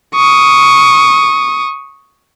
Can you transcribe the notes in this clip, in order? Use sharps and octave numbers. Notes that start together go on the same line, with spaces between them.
C#6 D#6